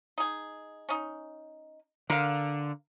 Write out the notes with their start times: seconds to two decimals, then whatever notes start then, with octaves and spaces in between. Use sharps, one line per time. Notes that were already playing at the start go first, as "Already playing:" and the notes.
0.18 D#4 G#4
0.89 C#4 D#4
2.10 D3 A#4 F5